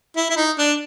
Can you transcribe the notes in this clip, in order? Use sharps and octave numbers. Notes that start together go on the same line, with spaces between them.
E4
E4
D#4
D4